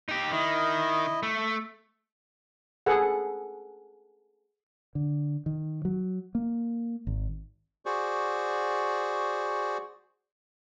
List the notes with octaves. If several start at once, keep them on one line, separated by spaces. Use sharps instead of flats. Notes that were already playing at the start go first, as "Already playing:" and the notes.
D#4 G4
D#3 E4 D#5
A3
G#4 A4 B4 F#5
D3
D#3
F#3
A#3
G#1
F#4 G#4 C5 D5 C#6